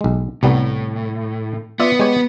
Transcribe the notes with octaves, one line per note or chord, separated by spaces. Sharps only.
B1 G#3
C2 A2 G3 B3
B3 F4 D5 E5
G#3 G4 C#5